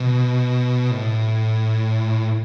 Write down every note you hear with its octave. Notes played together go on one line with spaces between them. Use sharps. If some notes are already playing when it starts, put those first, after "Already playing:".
Already playing: B2
A2